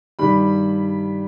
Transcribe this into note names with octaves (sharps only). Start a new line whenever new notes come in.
G2 D#3 G3 B5